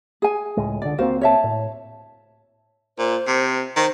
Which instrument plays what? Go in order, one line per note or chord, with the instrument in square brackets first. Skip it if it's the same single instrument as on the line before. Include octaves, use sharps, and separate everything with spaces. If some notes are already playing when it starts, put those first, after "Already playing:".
[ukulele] G#4 G#5
[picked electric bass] C#2 A2 G#3
[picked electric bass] C#2 D3 [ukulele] D5
[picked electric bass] C#2 A#3 C4 [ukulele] F#4 C5 F5
[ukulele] C#5 E5 A5
[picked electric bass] A2
[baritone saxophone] A#2 [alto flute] C5
[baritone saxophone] C3
[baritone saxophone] D#3 [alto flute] C5